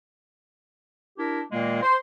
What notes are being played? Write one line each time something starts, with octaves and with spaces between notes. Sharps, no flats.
D4 E4 G4 A#4
A#2 D#3 G#3 A#3
C5 C6